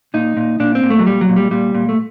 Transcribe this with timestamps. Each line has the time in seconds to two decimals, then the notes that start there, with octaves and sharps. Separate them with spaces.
0.14 A#2 D#4
0.37 A#2
0.60 A#2 D4
0.75 C4
0.83 A#2
0.90 A3
0.99 F#3
1.05 A#2 G3
1.21 F#3
1.29 A#2
1.36 G3
1.51 A#2 G3
1.75 A#2
1.89 A3